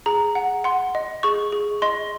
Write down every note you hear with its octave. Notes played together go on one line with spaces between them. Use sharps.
G#4 A#5
F#5
F#5 C6
D#5
G#4 C#6
G#4
D#5 C6